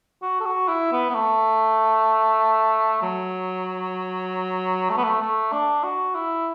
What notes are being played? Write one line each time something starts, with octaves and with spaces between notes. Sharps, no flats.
F#4
A4
F#4
E4
B3
B3
A3
F#3
A3
B3
A3
A3
D4
F#4
E4